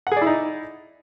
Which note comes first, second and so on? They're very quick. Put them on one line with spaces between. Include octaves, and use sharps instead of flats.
F#5 G#4 D5 E4 D#4